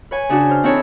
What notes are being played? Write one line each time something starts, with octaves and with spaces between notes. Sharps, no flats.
B4 C#5 G#5
C#3 D4 F#4
C5 F6
E3 C4 D#4 E4 A4 C#5